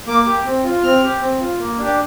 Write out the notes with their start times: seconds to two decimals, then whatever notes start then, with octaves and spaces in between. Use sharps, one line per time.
0.07 A#3 D6
0.26 G4
0.45 C4
0.64 F4
0.83 C4 F6
1.02 G4
1.21 C4
1.40 F4
1.59 A#3
1.78 D4 G4